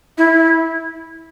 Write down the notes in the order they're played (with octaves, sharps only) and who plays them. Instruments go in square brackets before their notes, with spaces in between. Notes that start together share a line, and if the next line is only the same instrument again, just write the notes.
[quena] E4